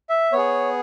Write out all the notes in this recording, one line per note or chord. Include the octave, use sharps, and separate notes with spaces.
E5
B3 G#4 C#5